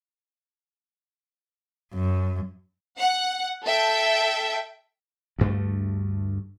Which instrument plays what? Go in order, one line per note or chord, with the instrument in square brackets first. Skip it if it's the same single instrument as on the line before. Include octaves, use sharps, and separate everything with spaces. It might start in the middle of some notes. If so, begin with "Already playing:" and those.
[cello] F#2
[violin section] F#5
A4 E5 G5
[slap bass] D2 G2 A3